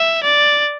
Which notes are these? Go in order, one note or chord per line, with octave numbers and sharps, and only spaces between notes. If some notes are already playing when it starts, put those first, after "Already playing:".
Already playing: E5
D5